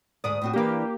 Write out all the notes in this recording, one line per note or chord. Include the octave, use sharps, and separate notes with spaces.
D2 G#2 D5 D#6
A2 C4 F#4
E3 A#3 D4 G4